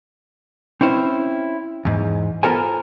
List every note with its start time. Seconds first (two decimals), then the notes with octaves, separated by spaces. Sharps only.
0.81 C4 C#4 E4 C5
1.85 E2 G#2
2.43 B3 F4 A4 A#4 C5 G#5